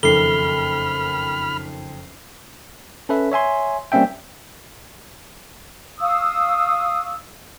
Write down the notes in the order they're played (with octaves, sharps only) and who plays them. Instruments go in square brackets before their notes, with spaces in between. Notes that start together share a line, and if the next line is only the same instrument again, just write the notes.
[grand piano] F#1 F2 D#3 [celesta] A4 [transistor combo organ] B5 F6 [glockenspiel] C7 G7
[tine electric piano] C#4 A4 B4 E5
C#5 E5 G#5 C6
G3 A#3 C4 C#4 E5 G5
[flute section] F5 C#6 D#6 E6